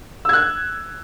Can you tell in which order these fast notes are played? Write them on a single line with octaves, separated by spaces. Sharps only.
E6 G#6 F#6